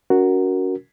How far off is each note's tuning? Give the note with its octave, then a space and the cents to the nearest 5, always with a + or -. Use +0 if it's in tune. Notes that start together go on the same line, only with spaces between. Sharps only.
C#4 +35 F#4 +0 A#4 +0